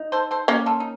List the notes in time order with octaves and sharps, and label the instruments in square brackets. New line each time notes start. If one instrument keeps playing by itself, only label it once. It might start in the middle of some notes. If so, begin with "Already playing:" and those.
Already playing: [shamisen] D#4
[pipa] A4 C5
A4 C5
[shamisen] A#3 C#4 [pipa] F#4 A#4
[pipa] F4 A4
D#4